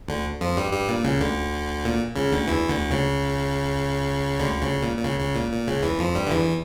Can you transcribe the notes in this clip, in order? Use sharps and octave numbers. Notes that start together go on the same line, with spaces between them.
D2 D3
F2 F3
G2 G3
G2 G3
A#2
C#2 C#3
D2 D3
A#2
C#2 C#3
D2 D3
E2 E3
D2 D3
C#2 C#3
D2 D3
C#2 C#3
A#2
A#2
C#2 C#3
C#2 C#3
A#2
A#2
C#2 C#3
E2 E3
F2 F3
G2 G3
D3
E2 E3